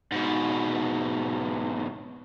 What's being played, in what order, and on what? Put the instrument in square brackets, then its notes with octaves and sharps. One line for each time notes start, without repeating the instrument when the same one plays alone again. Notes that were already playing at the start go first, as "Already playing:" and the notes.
[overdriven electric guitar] G#2 B2